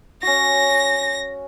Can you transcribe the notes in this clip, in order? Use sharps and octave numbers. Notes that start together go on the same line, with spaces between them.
C#4 F#4 A#6